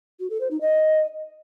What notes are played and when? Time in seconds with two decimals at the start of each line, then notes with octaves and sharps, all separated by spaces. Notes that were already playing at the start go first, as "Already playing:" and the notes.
0.20 F#4
0.30 A4
0.40 C5
0.51 D#4
0.61 D#5